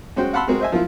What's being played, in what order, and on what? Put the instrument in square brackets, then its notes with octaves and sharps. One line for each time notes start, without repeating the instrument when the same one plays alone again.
[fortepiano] G#3 C#4 F#4 C5 G5
F5 F#5 A5 B5 C6 E6
G#3 C4 F#4 G#4 A#4
C5 D#5 E5 G#5
F3 A#3 E4 F4